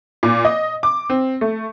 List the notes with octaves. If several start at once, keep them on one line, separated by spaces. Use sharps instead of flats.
A#2
D#5
D6
C4
A3